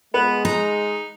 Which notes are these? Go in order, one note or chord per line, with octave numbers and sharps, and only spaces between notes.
G#3 B3 B4
D#4 A#5